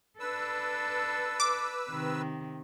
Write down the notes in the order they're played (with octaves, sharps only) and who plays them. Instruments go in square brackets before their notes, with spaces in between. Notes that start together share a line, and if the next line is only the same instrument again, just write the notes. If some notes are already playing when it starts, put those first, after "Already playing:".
[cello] D4 A4 [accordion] B4 E6
[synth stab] D6
[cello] C3 D#3